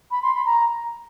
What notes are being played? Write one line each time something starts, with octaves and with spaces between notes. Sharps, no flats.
B5
C6
B5
A#5